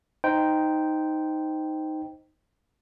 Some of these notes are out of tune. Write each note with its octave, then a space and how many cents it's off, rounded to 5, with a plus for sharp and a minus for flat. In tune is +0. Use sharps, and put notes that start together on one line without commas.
D#4 +0 C5 -10 G5 -5